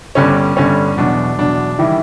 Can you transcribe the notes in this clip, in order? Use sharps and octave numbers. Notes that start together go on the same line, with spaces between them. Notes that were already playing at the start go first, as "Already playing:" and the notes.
G1 G2 D3 G3 C#4
G1 G2 D3 G3 C#4
E2 B2 F#3 D4
E2 B2 F#3 D4
D#3 E3 G3 E4